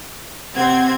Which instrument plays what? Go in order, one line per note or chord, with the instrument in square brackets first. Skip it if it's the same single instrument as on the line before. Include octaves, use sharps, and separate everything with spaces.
[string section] C3 C4 G#6 [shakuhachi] F#5